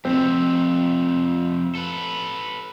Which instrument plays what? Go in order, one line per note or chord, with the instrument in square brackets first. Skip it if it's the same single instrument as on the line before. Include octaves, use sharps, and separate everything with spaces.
[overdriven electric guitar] F2 A3 [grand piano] C4
[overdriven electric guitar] A4 B4